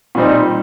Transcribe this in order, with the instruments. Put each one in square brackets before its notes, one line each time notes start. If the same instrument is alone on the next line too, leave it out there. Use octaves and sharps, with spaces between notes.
[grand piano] A#2 G3 C4 D#4